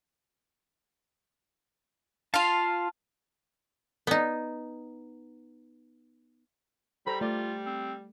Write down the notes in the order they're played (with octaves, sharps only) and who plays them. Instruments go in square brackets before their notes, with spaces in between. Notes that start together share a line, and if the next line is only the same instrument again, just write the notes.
[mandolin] F4 F5 [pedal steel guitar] A5
[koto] B3 D#4
[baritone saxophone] G3 [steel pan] A4 C5 A#5 [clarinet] B5
[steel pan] A3 D5 [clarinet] F4
[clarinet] C4